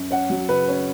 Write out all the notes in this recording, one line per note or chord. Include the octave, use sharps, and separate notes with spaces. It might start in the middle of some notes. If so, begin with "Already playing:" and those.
Already playing: F#2
C#4 F#5
F#3
C#3 B4
C#4